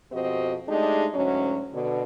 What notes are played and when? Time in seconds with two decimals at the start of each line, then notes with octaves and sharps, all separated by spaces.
0.12 F2 B2 C4 F#4 G4 D#5
0.67 G#3 A3 D4 D#4 G4 G#4
1.14 D2 G#2 F#3 C#4
1.73 B2 D3